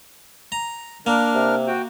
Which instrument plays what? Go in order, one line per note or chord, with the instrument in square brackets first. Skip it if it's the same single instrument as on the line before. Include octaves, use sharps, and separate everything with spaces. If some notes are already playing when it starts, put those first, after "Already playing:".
[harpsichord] A#5
[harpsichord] A#3 [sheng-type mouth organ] D4 A#4 F6
[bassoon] C3
[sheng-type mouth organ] F#4 G5